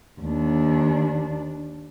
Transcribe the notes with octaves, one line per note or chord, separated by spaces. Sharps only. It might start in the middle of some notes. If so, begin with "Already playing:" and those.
D#2 D4